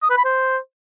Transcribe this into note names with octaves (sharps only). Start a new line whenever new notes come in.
D#6
B4
B5
C5